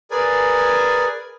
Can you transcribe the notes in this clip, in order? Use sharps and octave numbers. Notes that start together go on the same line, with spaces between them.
G#4 A#4 B4 D5 G#5